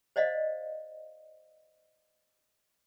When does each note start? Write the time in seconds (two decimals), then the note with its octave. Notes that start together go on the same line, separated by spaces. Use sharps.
0.16 C5 D5 D#5 F5